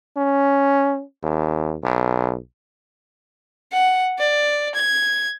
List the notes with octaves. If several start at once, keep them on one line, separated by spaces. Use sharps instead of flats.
C#4
D#2
B1
F#5
D5
G#6